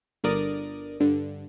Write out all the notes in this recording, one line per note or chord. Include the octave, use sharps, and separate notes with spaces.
G1 D3 A#4 D5 D#6
G2 D3